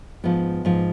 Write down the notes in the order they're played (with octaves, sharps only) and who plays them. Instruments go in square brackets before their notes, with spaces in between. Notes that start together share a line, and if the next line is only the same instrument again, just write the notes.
[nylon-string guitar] G#2 F3 B3
G#2 F3